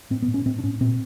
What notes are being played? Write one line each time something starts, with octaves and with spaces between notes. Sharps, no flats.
A2 C4
B3
A2
C#4
A2 C4
D4
A2 C#4
A#2 C4